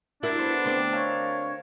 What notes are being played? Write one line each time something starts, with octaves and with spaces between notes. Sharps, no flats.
D4 E4 F#4 A#4
B3 A4 C5
D2 C4 D5
A#4 C#5 F5 A5